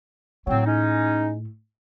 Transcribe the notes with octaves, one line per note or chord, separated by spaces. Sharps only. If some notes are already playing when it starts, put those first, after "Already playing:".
A2 F#3 A3 C4
G#3 C#4 D#4